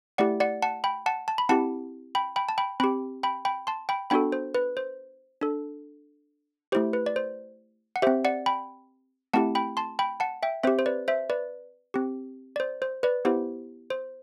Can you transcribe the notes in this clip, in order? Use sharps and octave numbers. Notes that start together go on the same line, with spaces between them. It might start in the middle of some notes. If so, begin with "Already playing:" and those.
A3 E4 G4 D5 F#5
D5 F#5
F#5 A5
G5 B5
F#5 A5
A5
B5
C4 E4 G4 F#5 A5
G5 B5
G5 B5
A5
G5 B5
C4 G4 G5 B5
G5 B5
G5 B5
A5 C6
G5 B5
B3 D4 F#4 A4 G5 B5
C5
B4
C5
D4 A4
A3 E4 G4 C5
B4
D5
C5
F#5
C4 G4 C5 E5
D5 F#5
G5 B5
A3 C4 E4 G4 F#5 A5
G5 B5
A5 C6
G5 B5
F#5 A5
E5 G5
C4 G4 C5 E5
C5
B4 D5
C5 E5
B4 D5
C4 G4
D5
C5
C5
B4 D5
B3 E4 G4 C5
C5